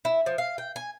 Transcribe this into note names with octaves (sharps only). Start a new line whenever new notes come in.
E4
F3
F5
G5
G#5